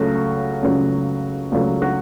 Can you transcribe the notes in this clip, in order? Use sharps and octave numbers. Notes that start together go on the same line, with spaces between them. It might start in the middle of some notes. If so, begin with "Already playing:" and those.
Already playing: C#2 C#3 F#3 A3 F#4
C#2 C#3 F#3 A3
C#2 C#3 F#3 A3 F4
F#4